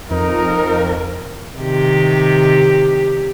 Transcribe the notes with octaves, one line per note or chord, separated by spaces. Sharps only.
F2 D#4 A#4
C3 D#3 G4